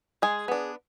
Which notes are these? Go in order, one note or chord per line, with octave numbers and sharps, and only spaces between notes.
G#3 G#4
B3 D4